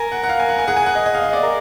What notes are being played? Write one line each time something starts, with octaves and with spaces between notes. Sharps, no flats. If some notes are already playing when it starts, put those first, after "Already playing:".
Already playing: A#4 G#5
F#5
F#5
F5
G#5
F#5
G#5
G#4 F#5
G#5
F#5
D#5
D#5
F5
D#5
D5
A#4